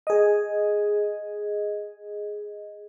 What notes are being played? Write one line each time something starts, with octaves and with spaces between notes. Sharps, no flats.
G#4 D#5